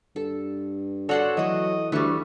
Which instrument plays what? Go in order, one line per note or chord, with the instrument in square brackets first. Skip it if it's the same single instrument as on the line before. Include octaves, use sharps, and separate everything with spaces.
[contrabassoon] G2 [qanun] A4
[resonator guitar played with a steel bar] F#4 A4 [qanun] C#5 F#5 C6 [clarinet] D5
[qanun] E3 A3 [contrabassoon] F#3 [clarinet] D#5
[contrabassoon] D2 [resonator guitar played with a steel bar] E3 G3 [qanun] A3 C#6